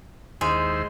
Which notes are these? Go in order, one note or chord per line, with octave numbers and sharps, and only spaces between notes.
D#2 G#3 E4 C5